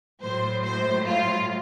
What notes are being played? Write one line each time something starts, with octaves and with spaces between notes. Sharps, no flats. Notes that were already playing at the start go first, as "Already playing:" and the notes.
A2 F#3 C5
C5
F4